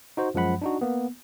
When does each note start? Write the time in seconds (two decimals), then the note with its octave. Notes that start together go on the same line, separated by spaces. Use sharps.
0.17 D#4 F#4 C5
0.35 F#2 F3 G#3 F#5 B5
0.62 D4 D#4 F#4
0.81 A#3 B3